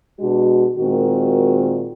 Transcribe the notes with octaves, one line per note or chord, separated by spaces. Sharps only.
B2 G#3 D4 F#4
A#2 D#3 G#3 C4 F#4 A#4